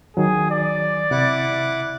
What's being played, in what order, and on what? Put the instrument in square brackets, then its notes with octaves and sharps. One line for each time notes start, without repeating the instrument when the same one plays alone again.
[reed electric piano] D#3 F#3 [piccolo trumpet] G#4
[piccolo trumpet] D5
[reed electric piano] C3 [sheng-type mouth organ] E4 F#5 D6